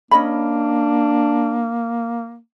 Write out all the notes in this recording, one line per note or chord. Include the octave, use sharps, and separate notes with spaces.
A#3 C#4 D4 D#5 B5